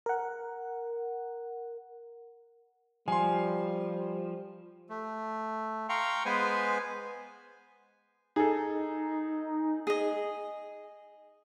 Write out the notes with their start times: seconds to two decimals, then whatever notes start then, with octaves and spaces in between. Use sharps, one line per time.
0.06 A#4 F#5
3.08 F3 G3 G#5 C6
4.89 A3
5.89 F5 G5 A#5 C6 C#6
6.26 G#3 B3 B4 C5 G#5
8.36 D#4 G#4 A4
9.87 G#4 D#5